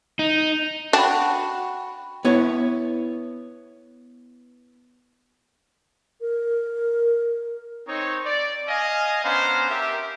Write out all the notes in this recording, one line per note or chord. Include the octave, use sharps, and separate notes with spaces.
D#4
D4 F#4 G5 B5
B3 E4 C#5
A#4
C4 D#4 C#5
D5
D#5 F5 G#5
B3 C#4 D4 C5 F5 A#5
G4 A#4 E5